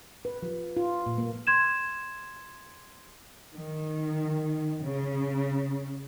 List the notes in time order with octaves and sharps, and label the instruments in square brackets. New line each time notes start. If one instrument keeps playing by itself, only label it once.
[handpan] B4
F3
F4
A#2
A#3
[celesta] C6 G#6 E7
[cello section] D#3
C#3